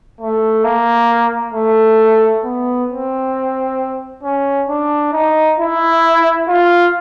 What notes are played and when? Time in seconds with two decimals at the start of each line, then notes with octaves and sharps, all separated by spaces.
0.21 A3
0.64 A#3
1.54 A3
2.44 B3
2.90 C4
4.23 C#4
4.69 D4
5.13 D#4
5.59 E4
6.48 F4